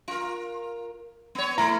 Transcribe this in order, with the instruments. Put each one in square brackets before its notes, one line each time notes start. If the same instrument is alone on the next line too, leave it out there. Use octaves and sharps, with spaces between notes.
[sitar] F4 A#4
B3 C#5
[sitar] A3 E4 [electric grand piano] A#5